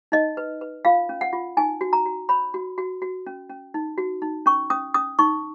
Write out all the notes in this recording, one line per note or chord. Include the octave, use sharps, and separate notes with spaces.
D#4 D#5
B4
B4
F4 F5
C#4
F#5
F4
D#4 G#5
F#4
A#5
F#4
C#5 B5
F#4
F#4
F#4
C#4
C#4
D#4
F#4
D#4
C#4 C#6
C#4 D#6
C#4 D#6
D#4 C#6